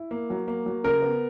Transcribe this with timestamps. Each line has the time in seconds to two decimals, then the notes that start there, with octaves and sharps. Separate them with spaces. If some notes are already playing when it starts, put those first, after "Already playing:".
Already playing: E4
0.11 A#3
0.30 F#3
0.48 A#3
0.66 F#3
0.84 C#3 A#4
1.02 B3